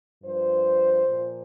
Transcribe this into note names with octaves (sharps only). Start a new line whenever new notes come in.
G2 F3 C5
A#2 F3